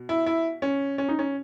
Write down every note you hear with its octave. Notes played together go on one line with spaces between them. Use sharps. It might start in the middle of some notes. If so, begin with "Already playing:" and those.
Already playing: B2
E4
E4
C#4
C#4
D#4
C#4